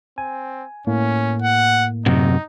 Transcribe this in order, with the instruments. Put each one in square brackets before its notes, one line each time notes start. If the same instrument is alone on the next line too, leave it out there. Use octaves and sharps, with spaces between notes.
[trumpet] C4 [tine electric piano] G#5
[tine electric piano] A2 A#3 [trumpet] C#4
[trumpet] F#5
[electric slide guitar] F#2 C3 [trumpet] D#4